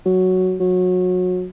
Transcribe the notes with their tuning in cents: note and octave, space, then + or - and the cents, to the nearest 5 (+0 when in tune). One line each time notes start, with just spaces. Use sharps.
F#3 +0
F#3 -25